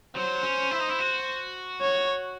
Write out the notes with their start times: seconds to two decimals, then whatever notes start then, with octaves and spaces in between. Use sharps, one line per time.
0.16 F#3 C5
0.43 C#4
0.71 E4
0.80 D#4
0.89 E4
0.99 F#4
1.81 C#5